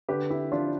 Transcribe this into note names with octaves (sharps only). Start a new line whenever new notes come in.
D3 G4 B4
E4 G4
F3 D4 F4